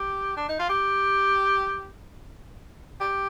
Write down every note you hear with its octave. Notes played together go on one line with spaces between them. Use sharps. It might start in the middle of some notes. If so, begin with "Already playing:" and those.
Already playing: G4
D4
D#4
F4
G4
G4